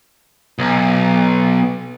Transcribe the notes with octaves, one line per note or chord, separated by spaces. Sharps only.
B1